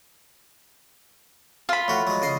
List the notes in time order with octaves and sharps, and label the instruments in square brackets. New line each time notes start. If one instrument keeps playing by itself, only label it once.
[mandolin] F4 B5
[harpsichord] A2 F#4
F#3 G#3
C#3 D#5 C6